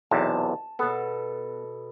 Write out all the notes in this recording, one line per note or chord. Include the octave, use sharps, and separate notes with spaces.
B1 E2 C3 A5
B2 B3 A4